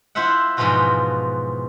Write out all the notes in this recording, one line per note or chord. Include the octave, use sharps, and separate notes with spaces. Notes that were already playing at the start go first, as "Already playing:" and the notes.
E4 F4 C5 E5 F#5
G#2 B2 E3 F3 F4 F#4